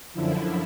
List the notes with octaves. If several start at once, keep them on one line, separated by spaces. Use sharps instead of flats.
F#2 D3 F3 E4